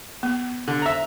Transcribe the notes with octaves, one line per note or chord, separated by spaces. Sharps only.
B3
D3
E5 A#5